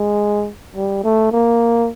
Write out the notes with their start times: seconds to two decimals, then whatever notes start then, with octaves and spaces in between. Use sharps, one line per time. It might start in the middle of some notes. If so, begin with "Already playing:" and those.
Already playing: G#3
0.76 G3
1.04 A3
1.32 A#3